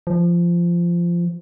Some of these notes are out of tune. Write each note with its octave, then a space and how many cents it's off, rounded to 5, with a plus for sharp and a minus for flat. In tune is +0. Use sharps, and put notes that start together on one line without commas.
F3 -15